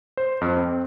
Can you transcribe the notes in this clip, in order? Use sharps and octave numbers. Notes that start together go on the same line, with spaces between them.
C5
F2
C4